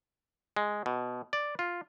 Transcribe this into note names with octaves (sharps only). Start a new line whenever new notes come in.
G#3
B2
D5
F4